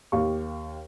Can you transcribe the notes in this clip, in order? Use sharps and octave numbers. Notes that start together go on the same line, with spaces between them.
D#2 G4 F5 C#6